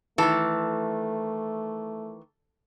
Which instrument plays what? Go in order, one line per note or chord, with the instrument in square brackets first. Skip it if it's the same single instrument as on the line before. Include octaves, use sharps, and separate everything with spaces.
[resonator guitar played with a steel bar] D#3 E3 [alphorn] A3 [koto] A4